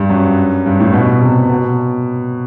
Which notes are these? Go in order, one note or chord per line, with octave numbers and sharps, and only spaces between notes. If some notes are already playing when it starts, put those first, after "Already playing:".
Already playing: G2
F#2
G2
A2
B2
C3
B2